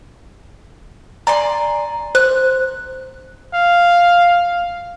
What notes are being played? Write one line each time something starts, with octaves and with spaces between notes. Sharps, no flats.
D5 G#5 A#5 C6
C5 F#6
F5